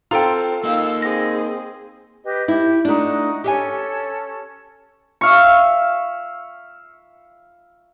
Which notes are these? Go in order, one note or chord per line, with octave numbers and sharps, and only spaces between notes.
C4 F4 A4 G5 A#5
A#3 D#4 F5 E6
C4 G#4 A#6
G4 B4 D#5
E4 G4
A3 D4 D#4 F#4
C#4 G4 A4 E5 G#5
E5 F5 C#6